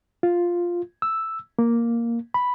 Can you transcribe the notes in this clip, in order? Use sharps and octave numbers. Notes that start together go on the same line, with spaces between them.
F4
E6
A#3
B5